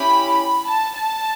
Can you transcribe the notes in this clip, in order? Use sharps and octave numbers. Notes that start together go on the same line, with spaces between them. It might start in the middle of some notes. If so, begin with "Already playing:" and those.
Already playing: C#4 E4 G4 B5
A5
A5